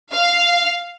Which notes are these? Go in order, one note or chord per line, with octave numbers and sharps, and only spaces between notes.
F5